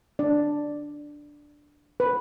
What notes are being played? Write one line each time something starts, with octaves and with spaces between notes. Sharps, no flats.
D4 D5
B4